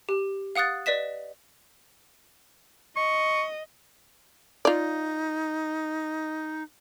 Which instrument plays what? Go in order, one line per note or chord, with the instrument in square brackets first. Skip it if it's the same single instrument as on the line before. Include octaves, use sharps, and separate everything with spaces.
[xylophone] G4
F5 F#5 D#6 F#6 A6
B4 D5 D#5 B6 E7
[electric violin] D#5 [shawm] C#6
[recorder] D#4 [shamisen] F4 D5